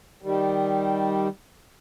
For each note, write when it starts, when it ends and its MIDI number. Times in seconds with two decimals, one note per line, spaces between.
0.22 1.28 51
0.22 1.28 55